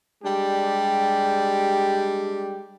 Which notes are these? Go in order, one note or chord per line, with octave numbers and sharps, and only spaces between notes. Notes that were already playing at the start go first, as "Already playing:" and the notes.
G3 G#3 D4 G4